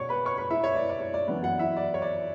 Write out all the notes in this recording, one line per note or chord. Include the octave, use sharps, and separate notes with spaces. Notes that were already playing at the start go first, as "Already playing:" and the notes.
Already playing: B2 C#5 D5 C#6
B4 B5
C#5 C#6
B4 B5
E4 E5
C#5
D5
D5
C#5
D5
F#2 E3 B3 D4
F#4 F#5
E4 E5
D5
C#5
D5